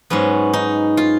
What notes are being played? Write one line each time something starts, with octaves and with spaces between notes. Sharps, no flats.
G#2 F#3 B3 C#4
D#4
F4